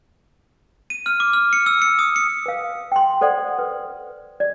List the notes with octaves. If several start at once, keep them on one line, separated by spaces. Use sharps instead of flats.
D#7
F6
D6
F6
C#7
E6
C#7
D#6
C#7
B4 F5
G5 C6
A4 C5 D5 F#5
B4
D5